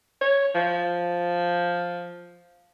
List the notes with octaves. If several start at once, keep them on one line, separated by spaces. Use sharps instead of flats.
C#5
F3